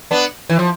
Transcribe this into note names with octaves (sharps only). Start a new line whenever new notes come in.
B3 D4
E3
F3